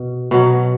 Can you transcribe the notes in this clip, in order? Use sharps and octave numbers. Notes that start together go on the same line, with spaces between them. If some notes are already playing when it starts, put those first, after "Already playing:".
Already playing: B2
B2 F#3